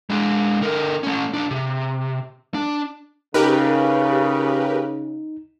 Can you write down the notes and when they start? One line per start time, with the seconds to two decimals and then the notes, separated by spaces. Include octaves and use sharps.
0.10 G#3 D4
0.61 D3 A#4
1.03 A3 C#4
1.34 B1 D4
1.51 C3
2.54 D4
3.34 C#3 D#4 G4 A#4 B4